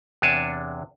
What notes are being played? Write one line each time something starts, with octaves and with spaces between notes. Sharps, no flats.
E2 C3 D4 C#5 G#5 A5